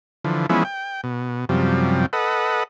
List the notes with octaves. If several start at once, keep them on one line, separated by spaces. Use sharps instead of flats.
D3 E3 F3
E3 F3 G#3 B3 C#4 E4
G5
B2
F#2 C3 F3 G3
A4 B4 D#5 F#5